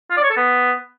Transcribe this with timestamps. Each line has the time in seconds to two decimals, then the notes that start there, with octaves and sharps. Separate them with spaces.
0.11 F4
0.17 D5
0.24 C#5
0.30 A4
0.37 B3